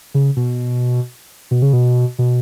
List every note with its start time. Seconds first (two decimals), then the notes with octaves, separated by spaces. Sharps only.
0.15 C#3
0.37 B2
1.51 B2
1.62 C#3
1.73 B2
2.19 B2